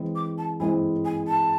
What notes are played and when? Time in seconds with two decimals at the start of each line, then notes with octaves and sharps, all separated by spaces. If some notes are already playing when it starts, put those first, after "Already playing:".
Already playing: E3 G#3 C4 E4
0.16 D6
0.38 A5
0.60 E3 G#3 C4 E4 G#5
1.05 G#5
1.28 A5